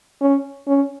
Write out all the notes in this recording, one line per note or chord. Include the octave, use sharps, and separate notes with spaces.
C#4
C#4